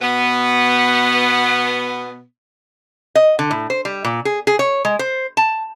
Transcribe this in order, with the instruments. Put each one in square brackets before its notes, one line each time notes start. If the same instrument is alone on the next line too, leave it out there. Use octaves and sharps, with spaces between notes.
[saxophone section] B2 B3
[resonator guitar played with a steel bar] D#5
D3
A2
C5
G3
A#2
G#4
G#4
C#5
G#3
C5
A5